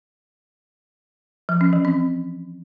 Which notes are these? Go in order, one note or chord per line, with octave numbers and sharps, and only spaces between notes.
F3
C#4
E3
C4